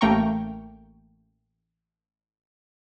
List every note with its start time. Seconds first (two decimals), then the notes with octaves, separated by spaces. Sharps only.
0.01 A1 A3 A#3 G5 A#5 C#6